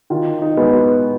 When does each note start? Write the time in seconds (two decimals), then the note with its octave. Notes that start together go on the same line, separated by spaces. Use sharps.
0.10 D#3 F4
0.42 D#4
0.57 G#3 B3
0.73 F#4